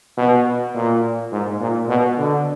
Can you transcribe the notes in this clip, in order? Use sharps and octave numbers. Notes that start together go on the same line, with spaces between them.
B2
A#2
G#2
A#2
B2
D3